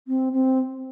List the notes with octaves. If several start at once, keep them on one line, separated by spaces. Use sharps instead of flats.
C4
C4